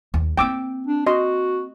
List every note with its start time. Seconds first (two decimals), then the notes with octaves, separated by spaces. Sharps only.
0.14 D#2
0.38 A#3 C4 G5 D6 E6
0.87 D4
1.07 F#4 D#5 C6